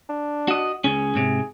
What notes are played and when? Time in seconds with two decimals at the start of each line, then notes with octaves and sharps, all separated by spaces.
0.09 D4
0.48 F#4 D#5
0.84 C#2 C#4 G#4
1.15 G#2 C3